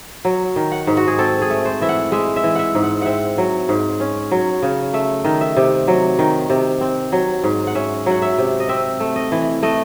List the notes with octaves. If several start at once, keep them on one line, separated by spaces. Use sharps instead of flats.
F#3
D#3
F#5
G#2
F#4
G#4
C4 A4
G#4
A3
C5
E3 E5
F#5
G#3 E5
E5
E3
E5 F#5
G#2
F#5
C4 E5 F#5
F#3
G#2
C#4
F#3
C#3
A3 E5
D#3
E5
C3
F#3
D#3
C3
C4
F#3
G#2
F#5
C#4 E5
F#3 F#5
E5
C3
D#5
C4 E5
A3
D#5
E3
A3 D#5